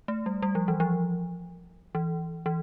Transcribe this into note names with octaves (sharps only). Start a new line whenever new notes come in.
A3
G3
G3
F3
E3
F3
E3
E3